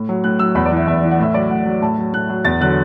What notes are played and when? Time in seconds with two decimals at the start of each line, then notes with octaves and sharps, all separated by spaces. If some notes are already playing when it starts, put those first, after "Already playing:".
Already playing: A2
0.09 F#3
0.24 A2 F#6
0.39 F#3 E6
0.55 E2 B5
0.66 D5
0.71 E3
0.77 E5
0.87 E2 E5
1.03 E3
1.11 F#5
1.19 A2 E5
1.34 F#3 D5
1.50 A2 F#5
1.66 F#3
1.82 A2 A5
1.98 F#3
2.13 A2 F#6
2.29 F#3
2.45 E2 A6
2.61 D3 F#3 F#6